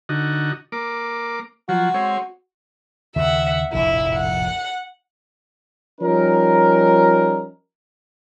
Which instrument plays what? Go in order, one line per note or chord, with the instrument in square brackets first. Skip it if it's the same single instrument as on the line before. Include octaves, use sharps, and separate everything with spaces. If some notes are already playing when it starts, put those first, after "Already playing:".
[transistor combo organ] D3 D#4 F#4
A#3 D6
[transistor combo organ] F3 F#3 [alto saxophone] F#4
[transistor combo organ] G#3 C4 C#5
[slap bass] D#2 C#3 [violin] E5 F#5
[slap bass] F1 A#1 A2 [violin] E4
[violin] F#5
[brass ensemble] F3 G3 C#4 D#4 A#4